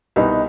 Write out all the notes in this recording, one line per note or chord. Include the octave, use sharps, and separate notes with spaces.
C2 B2 G3 B3 D#4